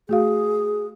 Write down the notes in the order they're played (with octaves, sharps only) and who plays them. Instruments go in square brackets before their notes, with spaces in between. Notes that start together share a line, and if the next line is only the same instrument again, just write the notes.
[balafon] A3 F#4 F5 [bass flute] G#4